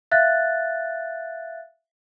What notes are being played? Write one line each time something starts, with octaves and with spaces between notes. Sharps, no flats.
E5 F5 F#6 A6